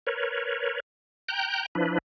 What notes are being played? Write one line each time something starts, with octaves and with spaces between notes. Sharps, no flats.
A#4 B4 C#5
G5 A#5 F#6 G6
F3 D4 E4 B4